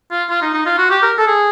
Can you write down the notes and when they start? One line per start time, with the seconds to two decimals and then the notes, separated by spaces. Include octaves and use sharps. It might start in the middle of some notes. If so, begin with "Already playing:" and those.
0.11 F4
0.29 F4
0.42 D#4
0.54 D#4
0.66 F4
0.78 F#4
0.90 G4
1.02 A#4
1.18 A4
1.27 G#4